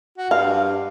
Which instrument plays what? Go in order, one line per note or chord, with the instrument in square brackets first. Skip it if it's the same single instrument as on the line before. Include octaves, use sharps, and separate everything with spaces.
[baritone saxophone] F#4
[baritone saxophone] G2 [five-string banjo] F5